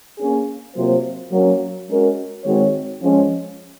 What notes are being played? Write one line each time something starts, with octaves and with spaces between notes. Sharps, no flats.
A#3 C#4 G#4
C3 F#3 A#3 F4 C5
F#3 A#3 C#4
G#3 C#4 F#4 A#4
D#3 G#3 C4 F#4 C#5
F3 G#3 C#4